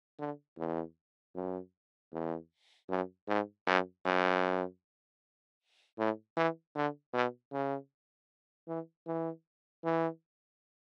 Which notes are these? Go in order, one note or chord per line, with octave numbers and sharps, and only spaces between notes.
D3
E2
F#2
E2
F#2
G#2
F#2
F#2
A2
E3
D3
B2
C#3
E3
E3
E3